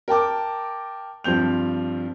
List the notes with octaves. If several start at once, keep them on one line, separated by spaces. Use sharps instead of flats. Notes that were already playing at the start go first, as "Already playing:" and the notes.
A#4 G5 A5 D6
G2 F3 C4 G6 F7